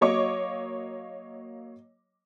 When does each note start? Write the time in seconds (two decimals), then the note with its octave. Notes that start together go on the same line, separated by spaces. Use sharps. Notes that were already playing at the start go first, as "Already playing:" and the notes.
0.01 F#3 A#3 C#5 D#5 C#6 D6